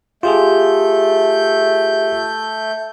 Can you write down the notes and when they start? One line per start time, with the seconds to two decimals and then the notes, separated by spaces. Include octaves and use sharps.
0.23 A3 F4 G4 G#4 G6